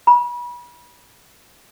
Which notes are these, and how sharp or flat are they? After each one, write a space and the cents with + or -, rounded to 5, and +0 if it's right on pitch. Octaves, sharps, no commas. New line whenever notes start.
B5 -35